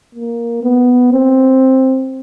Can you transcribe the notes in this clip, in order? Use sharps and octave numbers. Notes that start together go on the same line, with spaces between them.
A#3
B3
C4